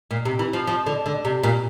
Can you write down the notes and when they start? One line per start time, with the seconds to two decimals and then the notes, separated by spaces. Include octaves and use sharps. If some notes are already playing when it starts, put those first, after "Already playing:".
0.11 A#2
0.25 C3
0.39 E3
0.53 F3
0.67 F3
0.86 D3
1.06 D3
1.25 C3
1.43 A#2